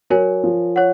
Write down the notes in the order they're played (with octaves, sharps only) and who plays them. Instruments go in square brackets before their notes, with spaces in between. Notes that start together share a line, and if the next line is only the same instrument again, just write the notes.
[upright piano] F#3 [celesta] A#4 C#5 G#5
[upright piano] F3
[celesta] C#5 F#5